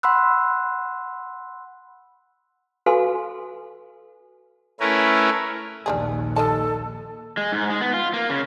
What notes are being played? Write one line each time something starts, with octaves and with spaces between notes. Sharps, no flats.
F#5 B5 C6 E6 F#6
F#4 A4 B4 F5 G#5 C6
A3 C#4 E4 A#4 B4
A#1 D#2 G3 D4 G#4
D#3 A4 D#5 A5
G#3
G#2
G#3
B3
F4
A#3
C#3